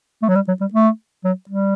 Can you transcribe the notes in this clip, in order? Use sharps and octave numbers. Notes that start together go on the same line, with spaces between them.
A3
F#3
G3
F#3
G3
A3
F#3
G3